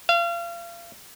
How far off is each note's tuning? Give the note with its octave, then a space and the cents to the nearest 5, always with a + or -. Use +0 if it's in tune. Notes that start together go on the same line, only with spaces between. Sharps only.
F5 -35